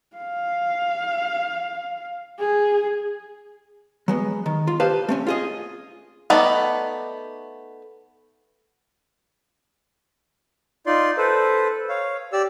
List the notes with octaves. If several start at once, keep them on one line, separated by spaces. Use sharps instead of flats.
F5
G#4
F#3 G#3 B3
D#3
F4
G4 B4 C5 D#5 F5 A5
A3 C4 C#4
F4 G#4 D#5
A3 B3 D#4 D5
D#4 F4 D5 C6
A4 B4 C5
C#5 F5
G4 D5 E6